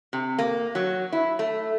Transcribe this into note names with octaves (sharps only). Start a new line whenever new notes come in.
C3
A#3
F#3
E4
A3